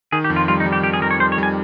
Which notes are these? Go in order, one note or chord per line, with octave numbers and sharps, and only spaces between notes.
D#3 G#4
G4
F2
F4
G3 F4
D#4
G3
G4
F2 G4
G#4
F2 A#4
C#5
G3 C5
C#5
G3 G#5